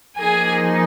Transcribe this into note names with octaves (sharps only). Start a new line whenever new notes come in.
F3 A#3 D#4 G#4 G#5